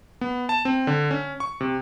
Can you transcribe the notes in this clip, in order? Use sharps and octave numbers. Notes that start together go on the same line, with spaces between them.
B3
A5
C4
D3
C#4
C#6
C3